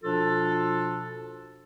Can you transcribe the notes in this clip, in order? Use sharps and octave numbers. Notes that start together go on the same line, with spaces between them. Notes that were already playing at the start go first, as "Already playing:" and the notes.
B2 F3 D4 F4 A4